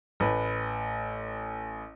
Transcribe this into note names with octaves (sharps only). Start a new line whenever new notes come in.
A1 B4